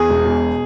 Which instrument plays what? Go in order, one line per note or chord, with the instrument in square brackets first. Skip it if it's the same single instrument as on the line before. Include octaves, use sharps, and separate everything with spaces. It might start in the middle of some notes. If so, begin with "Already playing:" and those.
Already playing: [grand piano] E2 G#4
E1
B2